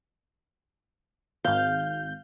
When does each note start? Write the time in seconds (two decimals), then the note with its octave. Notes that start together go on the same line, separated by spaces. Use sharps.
1.45 G#1 F5 G6